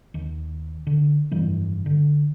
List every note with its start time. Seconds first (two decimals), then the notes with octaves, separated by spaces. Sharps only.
0.14 D#2
0.87 D3
1.31 F1 G2 E3 G3
1.86 D3